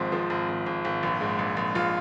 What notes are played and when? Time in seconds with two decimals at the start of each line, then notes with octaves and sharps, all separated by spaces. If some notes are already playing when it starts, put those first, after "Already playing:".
Already playing: G#1 G#2 F3 C4
0.12 F3
0.30 G#1
0.49 G#1
0.66 G#1
0.85 G#1
1.03 A#1
1.21 G#2
1.39 A#1
1.57 A#1
1.75 A#1 F4